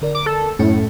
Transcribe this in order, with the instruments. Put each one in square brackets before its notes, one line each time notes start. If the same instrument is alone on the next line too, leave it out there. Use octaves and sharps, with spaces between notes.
[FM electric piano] D3 A#4 D5
[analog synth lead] D6
A4
[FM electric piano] F#2 A3 C#4 [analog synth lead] A2